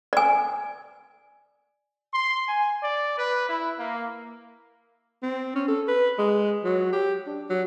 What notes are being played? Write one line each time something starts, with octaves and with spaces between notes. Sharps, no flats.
D5 G#5
C6
G#5
D5
B4
E4
A#3
C4
C#4
A4
B4
G#3
F#3
G4
D4
F#3